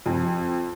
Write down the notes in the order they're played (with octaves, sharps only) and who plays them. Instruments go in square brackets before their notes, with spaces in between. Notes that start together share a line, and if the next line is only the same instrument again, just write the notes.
[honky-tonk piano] F2